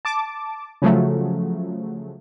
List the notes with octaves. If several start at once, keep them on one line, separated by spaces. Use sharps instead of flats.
A5 D6
C#3 F3 F#3 A3